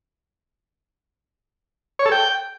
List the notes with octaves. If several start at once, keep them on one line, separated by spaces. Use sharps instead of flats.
C#5
A4
G5